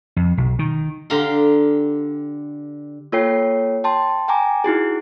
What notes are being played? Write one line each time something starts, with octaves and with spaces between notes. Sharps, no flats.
F2
B1
D#3
D3 G4 F5 A#5 C6
A#3 F4 A4 C#5 G5 C7
G5 A5 C6
G5 G#5 A#5 D6
D#4 E4 F#4 G#4